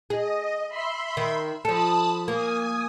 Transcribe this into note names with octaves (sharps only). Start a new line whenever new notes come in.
G#4 D#5
E5 B5 C6
D#3
F3 A4 A5 B5 D#6
A#3 G#5 D#6